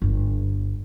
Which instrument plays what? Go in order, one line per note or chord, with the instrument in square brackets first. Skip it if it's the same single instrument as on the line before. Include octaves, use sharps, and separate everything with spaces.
[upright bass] G1 G2